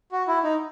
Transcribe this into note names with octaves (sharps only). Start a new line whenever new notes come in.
F#4
E4
D#4